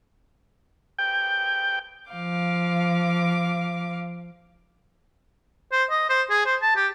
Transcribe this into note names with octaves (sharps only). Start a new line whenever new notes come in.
G5
F3 F5 D6
C5
D#5
C5
G#4
C5
A5
G4